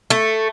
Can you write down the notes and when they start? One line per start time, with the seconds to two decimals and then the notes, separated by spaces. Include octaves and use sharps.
0.10 A3